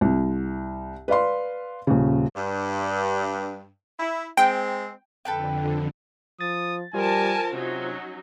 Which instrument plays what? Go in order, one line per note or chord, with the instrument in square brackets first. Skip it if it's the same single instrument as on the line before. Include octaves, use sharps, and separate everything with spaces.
[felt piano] C2
B4 D5 F5 C6
D#1 C#3
[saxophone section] G2
E4
[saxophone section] G#3 C4 [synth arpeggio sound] G5
[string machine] F2 D3 [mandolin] A4 B4 G5
[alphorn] F3 [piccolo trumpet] D#6 [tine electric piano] A6
[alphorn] G3 [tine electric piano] F4 C5 C6 [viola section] A#4 A5 [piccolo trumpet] G#5
[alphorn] C3 [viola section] F#3 C#4 D#4 [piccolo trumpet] F#4